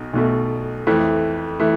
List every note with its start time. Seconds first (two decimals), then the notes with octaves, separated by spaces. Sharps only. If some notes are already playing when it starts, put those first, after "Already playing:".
Already playing: B1 B2
0.13 B1 B2 A3
0.87 F2 E3 A3
1.60 E3 A3